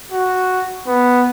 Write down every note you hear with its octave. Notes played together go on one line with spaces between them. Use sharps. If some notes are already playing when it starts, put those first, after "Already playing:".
F#4
B3